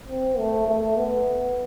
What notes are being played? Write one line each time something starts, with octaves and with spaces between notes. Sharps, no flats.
C4
A3
A3
B3